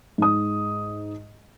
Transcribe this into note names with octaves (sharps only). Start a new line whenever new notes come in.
G#2 D#6